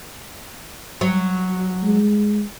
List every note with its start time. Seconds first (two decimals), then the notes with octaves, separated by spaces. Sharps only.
1.01 F#3
1.84 G#3